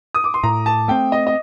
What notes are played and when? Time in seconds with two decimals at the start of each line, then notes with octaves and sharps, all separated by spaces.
0.14 D#6
0.24 D6
0.34 C6
0.43 A2 A#5
0.66 A5
0.88 A3 C4 G5
1.12 D#5
1.27 D#5